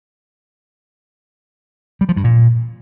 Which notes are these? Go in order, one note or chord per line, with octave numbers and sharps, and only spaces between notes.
G3
F3
G2
A#2